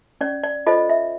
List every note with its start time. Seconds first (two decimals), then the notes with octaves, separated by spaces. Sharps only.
0.21 C#4 D5
0.43 D5
0.67 F4 A4 C5 D#5
0.89 E5